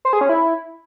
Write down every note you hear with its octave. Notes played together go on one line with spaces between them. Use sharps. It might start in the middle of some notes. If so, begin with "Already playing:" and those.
C5
G#4
C#4
E4